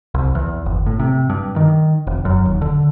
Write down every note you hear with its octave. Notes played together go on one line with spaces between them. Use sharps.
C2
E2
G1
A2
C3
G2
D#3
F1
F#2
D#1
D3